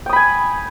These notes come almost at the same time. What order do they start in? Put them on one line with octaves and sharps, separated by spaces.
G5 D#6 B5 G#5